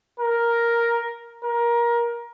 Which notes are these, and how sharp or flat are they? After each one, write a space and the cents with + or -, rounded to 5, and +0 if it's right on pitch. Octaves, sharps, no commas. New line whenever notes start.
A#4 +5
A#4 +20